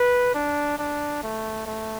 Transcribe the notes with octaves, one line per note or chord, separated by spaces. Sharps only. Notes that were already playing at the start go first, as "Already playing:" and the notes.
Already playing: B4
D4
D4
A3
A3